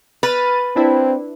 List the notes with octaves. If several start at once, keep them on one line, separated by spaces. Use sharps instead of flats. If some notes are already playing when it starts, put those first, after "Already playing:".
B4 F6 A6 D#7
C4 D4 E4